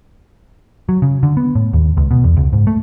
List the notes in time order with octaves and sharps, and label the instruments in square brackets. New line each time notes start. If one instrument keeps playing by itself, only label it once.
[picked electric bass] F#3
C#3
D3
B3
A2
D#2
C#2
B2
E2
C#2
G#2
A3